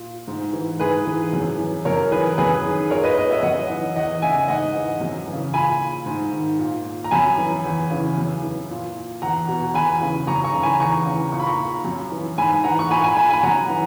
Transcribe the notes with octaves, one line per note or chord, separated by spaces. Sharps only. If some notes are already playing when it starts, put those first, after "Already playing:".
Already playing: A#2
G#2
E3
G#2 G#4 B4
E3
F#2
E3
F#2 A#4 C#5
E3 G#4 B4
F#2 G#4 B4
D#3
A#2 A#4 C#5
B4 D#5
B4 D#5
C#5 E5
F#2 D#5 F#5
E3
E2 D#5 F#5
C#3 E3 E5 G#5
G#2 D#5 F#5
E3
F#2
C#3 E3
A#2 G#5 B5
G#2
D#3
A#2
A#5
F#2 G#5 B5
E3
E2
C#3 E3
F#2
E3
A#2
E2 F#5 A#5
B2
E2 G#5 B5
C#3 E3
F#2 A#5 C#6
A#5 C#6
C#3 E3
G#5 B5
E2 A#5 C#6
C#3 E3
A#2 C#6
B5
A#5 C#6
F#2
E3
G#2 G#5 B5
E3 F#5 A#5
C#6
A#2 G#5 B5
G#5 B5
G#5 B5
G#5 B5
F#2 F#5 A#5
E3